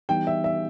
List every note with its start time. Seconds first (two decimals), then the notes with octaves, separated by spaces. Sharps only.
0.09 E3 G3 B3 D#4 G4 G5
0.27 E5
0.44 E5